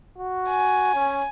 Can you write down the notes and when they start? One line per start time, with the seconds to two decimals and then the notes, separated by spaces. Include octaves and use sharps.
0.18 F#4
0.49 G#5
0.95 C#4